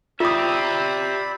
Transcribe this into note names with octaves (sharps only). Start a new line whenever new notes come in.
C4 F4 G4 D5 E5 B5 D#6